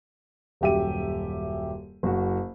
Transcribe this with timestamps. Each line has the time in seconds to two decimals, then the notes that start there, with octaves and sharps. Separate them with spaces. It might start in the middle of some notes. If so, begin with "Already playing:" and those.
0.61 D#1 F#2 G4 E5 D#7
2.03 F#1 F#4